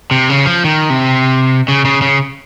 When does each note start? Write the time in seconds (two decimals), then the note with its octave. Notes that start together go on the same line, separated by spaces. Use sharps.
0.11 C3
0.30 C#3
0.46 F3
0.64 D#3
0.90 C3
1.68 C#3
1.85 C#3
2.02 C#3